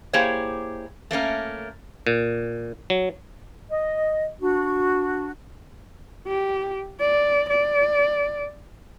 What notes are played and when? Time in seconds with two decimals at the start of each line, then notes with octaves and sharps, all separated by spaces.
0.13 A#3 E4 G4 G#4 C5 C#5
1.11 A3 A#3 C#4 A#4
2.07 A#2
2.90 F#3
3.71 D#5
4.41 D4 F#4
6.27 G4
7.00 D5
7.50 D5